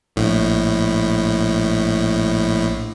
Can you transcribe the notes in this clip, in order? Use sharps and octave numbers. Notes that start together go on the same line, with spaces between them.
A#1 A2